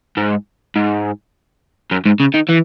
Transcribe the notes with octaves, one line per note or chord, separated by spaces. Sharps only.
G#2
G#2
F#2
G#2
C#3
D#3
E3